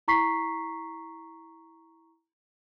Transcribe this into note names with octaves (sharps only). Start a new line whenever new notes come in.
E4 A#5 C#6 B6 C7